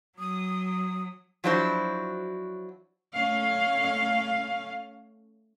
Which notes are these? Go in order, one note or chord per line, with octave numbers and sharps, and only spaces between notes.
F#3 D#6
F3 F#3 D4 E4 F#4 C5
A3 C#4 F5